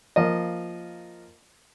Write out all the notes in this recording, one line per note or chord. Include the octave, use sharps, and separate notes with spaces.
F3 A#3 D#5